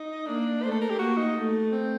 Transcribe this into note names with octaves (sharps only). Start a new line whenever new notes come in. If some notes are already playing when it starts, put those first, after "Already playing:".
Already playing: D#4
A#3 D4
A3 C5
A4
A#4
G4
A#3 F#4
D#4
A3
C4